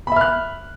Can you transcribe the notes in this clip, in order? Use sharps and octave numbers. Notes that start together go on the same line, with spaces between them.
E5 B5 F6 F#6